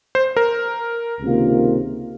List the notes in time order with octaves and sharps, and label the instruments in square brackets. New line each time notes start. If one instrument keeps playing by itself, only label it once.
[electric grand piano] C5
A#4
[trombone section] C#2 C3 D#3 A#3 F4